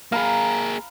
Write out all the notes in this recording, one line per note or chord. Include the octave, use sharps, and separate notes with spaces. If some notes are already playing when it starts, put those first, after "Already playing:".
A#3 G#4 F5 A#5 B5